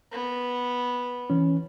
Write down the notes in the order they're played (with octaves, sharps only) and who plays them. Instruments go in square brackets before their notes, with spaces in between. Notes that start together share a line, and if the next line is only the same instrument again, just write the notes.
[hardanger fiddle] B3
[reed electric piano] E3 C#4